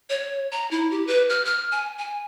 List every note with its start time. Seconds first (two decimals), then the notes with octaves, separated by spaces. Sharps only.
0.10 C#5
0.52 A#5
0.71 E4
0.91 G4
1.07 B4
1.29 F6
1.45 F6
1.71 G#5
1.98 G#5